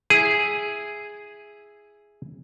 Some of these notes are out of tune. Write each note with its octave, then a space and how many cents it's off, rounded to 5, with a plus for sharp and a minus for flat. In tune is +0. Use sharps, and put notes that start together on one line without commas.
E4 +0 G#4 +0